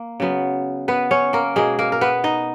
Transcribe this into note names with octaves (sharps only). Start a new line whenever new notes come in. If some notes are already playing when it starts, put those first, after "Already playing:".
Already playing: A#3
C#3 F#3 B3
B3 B4
C#4 C#5
A#3 A#4
B2 G#3 A#3 G#4
A#3 A#4
A#4
B3 B4
D#4 D#5